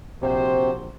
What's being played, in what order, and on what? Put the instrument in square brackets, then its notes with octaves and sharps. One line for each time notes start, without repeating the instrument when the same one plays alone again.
[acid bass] A#1 [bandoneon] C3 [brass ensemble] F#4 C5